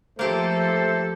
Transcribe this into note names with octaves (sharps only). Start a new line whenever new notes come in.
F3 A3 A#3 G4 A4 C5